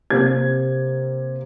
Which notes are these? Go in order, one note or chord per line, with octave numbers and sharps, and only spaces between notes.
C3 A#3 C4 G4 G#6